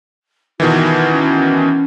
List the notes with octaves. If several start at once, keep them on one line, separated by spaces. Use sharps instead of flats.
B2 D#3 E3 F4
C#4